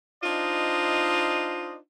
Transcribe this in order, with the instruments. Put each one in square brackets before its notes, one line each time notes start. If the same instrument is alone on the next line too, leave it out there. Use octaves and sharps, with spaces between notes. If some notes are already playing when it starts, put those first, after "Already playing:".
[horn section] D4 D#4 F4 C5 D#5